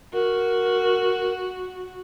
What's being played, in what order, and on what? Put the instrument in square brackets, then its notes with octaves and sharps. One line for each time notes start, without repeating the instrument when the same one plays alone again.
[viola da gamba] F#4 [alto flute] A#4